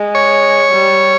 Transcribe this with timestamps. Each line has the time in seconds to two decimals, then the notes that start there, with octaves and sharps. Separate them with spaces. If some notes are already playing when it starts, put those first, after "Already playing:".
Already playing: G#3
0.15 C#5
0.72 G3